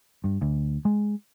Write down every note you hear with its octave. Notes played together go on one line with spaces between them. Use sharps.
G2
D2
G#3